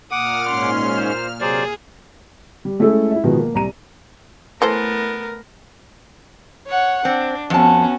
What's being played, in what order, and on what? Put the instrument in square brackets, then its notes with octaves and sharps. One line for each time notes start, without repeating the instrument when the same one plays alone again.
[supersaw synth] A#2 F6 [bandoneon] F#5 D6 [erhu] D#6
[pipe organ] G#2 C#4 [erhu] C6
[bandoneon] C5
[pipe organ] C3 [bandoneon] F#3 C5 D5 [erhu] G#4
[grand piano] G3
G#3 A3 C#4 E4 G#4 A4
E4 E5
B2 D#3 F3 G#3 B3
A#3
C2 A#5 D#7
[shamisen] E3 A4 C5 [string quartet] A3 B3 [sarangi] A#4
[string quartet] C#5 F#5
[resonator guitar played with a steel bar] C4 [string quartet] D4
[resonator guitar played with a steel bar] F2 A5 [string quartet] B3 C#4 F#4